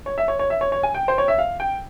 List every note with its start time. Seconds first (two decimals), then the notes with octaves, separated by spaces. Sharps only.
0.06 C#5
0.18 E5
0.28 C#5
0.39 C#5
0.50 E5
0.61 C#5
0.72 C#5
0.83 G#5
0.95 G5
1.08 C5
1.18 C#5
1.28 E5
1.38 F5
1.60 G5